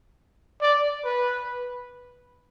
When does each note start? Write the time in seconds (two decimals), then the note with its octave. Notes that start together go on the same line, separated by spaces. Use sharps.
0.61 D5
1.05 B4